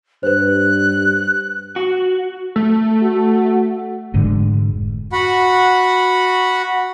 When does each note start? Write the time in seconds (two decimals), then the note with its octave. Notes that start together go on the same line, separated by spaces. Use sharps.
0.23 G2 B4 C5 F#6
1.76 F#4
2.56 A3
3.03 F#4
4.14 F1 G#2 D3
5.12 F#4 F#5 B5